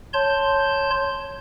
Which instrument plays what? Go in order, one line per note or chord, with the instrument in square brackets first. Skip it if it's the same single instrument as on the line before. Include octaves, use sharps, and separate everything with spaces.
[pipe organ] C#5 A5 C6 G6